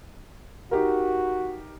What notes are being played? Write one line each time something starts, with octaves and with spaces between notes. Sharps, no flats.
D#4 F#4 G4 A#4